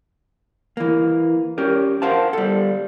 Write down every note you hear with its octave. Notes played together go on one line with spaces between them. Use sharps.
E3 A#3
C#4 G4 A#4
A#4 C5 F5 F#5 A5
G3 A4